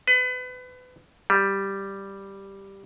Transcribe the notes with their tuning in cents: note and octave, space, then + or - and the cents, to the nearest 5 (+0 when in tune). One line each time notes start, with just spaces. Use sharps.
B4 +30
G3 +0